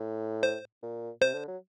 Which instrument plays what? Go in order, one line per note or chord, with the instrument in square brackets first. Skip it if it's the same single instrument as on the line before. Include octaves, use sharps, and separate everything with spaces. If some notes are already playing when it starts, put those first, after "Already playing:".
Already playing: [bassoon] A2
[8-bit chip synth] C5
[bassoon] A#2
[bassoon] C3 [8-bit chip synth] C5
[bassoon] D3
F#3